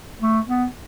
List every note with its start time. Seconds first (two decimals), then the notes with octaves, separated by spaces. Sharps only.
0.22 A3
0.47 B3